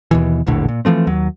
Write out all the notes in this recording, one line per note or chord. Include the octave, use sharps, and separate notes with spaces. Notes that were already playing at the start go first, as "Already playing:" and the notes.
D#2 B2 E3
E1 A#1 A2 D3
A#2
E3 F3 A3 C4
D#2 F#3